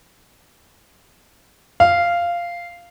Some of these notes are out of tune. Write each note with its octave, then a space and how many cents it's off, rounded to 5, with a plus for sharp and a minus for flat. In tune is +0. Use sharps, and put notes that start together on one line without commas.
F5 -10